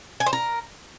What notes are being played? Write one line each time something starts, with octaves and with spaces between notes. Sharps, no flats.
G#5
C5
A#4